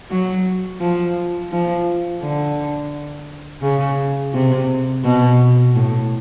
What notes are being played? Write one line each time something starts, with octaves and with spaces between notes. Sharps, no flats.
F#3
F3
F3
D3
C#3
C3
B2
A2